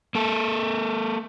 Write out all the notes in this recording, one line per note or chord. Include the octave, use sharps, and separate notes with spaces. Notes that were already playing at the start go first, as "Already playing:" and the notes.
A#3 A4